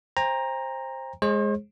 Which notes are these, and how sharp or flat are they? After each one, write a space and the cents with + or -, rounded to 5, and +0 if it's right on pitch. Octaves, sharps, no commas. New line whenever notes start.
C5 +15 G5 +40 A#5 +0
G#3 +0 G#4 +0 C5 +45